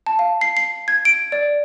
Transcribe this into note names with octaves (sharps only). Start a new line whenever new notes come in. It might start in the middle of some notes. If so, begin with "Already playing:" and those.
A5
F5
C7
C7
G#6
D7
D5